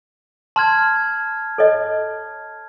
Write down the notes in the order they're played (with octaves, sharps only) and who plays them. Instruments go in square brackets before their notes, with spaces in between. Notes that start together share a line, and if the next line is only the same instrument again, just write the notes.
[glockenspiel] A5 F6 G#6 [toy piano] C6
[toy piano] A4 C#5 D#5